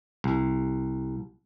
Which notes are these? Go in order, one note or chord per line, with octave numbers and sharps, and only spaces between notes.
C2